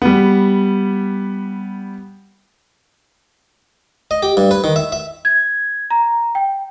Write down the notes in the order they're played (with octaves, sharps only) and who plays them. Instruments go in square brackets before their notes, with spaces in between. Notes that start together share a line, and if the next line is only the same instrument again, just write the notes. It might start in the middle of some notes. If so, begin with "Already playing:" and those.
[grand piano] G3 B3
[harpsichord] D#5
G4
G2
B4
D#3
E5
E5
[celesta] G#6
A#5
G5